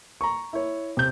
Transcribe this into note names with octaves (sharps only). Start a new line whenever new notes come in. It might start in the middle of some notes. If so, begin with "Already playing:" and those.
A#5 C#6
E4 C#5
C3 G6